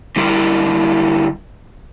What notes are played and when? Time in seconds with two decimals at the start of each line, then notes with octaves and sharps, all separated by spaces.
0.16 D3 G3 E4 A#4